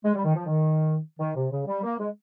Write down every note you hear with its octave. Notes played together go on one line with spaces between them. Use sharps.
G#3
G3
D#3
F3
D#3
D#3
C3
C#3
G3
A#3
G#3